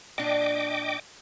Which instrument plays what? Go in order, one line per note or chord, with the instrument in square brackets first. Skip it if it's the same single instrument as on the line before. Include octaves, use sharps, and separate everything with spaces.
[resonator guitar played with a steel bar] A#2 D4 [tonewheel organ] D#5 G5 D6